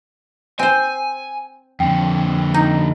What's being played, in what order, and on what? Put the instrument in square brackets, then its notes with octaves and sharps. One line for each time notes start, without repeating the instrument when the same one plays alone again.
[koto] C4 C5 [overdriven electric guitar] G#5
[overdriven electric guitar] F2 D3 [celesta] G5
[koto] D#4